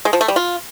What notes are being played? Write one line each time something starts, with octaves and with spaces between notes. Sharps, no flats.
G#3
F3
A3
G3
F4